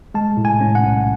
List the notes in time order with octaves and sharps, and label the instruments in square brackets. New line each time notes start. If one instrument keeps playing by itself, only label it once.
[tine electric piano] G#3 A5
A2
G#5
C#4
F#5
B1